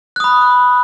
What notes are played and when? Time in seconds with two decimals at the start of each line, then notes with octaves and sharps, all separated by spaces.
0.16 F#6
0.20 D#6
0.24 B5